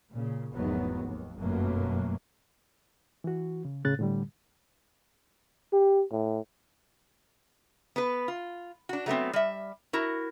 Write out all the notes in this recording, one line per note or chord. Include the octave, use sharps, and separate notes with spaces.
A#2 C#3
F1 E2 G#2 D#3 F#3 B3
D#2
G1 F#2 B2 F#3 A3 A#3
E3 F#4
C#3
A2 C#3 F#6 A6
A2 D3 G3
G4
A2
B3 B4
F4
D4 F#4
F#3 A3 B3 C4
G3 E5
E4 F#4 A#4